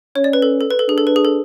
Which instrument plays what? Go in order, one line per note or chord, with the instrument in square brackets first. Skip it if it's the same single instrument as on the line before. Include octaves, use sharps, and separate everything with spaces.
[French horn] C#4 [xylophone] C#5
[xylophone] D5
B4
A4
A4
B4
A4
[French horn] D4 [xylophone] G#4
[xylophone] A4
B4
G#4
A4